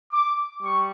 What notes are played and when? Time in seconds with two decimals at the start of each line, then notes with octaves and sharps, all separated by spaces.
0.13 D6
0.62 G3 C#6